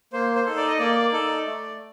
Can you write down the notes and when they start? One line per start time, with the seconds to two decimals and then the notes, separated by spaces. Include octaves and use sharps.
0.13 A#3 C5
0.35 C5
0.46 D#4 A4
0.57 D5
0.68 D#5
0.79 A#3 D5
1.12 D#4 A4
1.46 A3